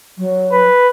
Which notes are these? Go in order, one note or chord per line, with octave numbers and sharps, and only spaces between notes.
F#3
B4